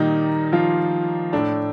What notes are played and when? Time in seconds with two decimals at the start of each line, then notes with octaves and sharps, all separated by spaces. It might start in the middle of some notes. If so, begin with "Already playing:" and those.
Already playing: A#2 D#3 G3 A#3 D#4
0.52 F3 F4
1.32 A2 A3 D4